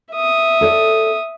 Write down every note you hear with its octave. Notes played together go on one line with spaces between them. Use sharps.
E5 D#6
A4 C#5 D5